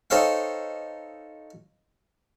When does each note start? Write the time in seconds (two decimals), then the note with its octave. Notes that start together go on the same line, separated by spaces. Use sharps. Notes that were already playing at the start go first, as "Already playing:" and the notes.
0.10 D#4 A4 C5 C#5 F5 G5